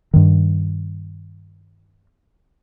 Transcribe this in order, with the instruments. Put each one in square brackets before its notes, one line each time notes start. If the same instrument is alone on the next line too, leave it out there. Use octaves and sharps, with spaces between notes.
[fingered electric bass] G2 D#3